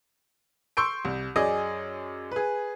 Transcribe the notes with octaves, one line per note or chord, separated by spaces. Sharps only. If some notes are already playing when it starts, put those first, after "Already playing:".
C6 C#6 E6 G6 D7
C2
F#2 G#4 D5 D#5 D#6
G#4 B4